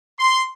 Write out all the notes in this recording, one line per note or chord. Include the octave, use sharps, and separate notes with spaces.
C6